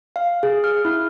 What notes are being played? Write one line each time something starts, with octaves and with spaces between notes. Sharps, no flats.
F5
G#4
F6
E4